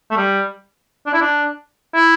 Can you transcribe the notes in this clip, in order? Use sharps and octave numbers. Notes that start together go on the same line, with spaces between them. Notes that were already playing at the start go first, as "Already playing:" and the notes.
A3
G3
D4
E4
D4
E4